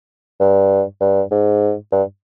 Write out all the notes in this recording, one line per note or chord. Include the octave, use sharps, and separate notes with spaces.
G2
G2
G#2
G2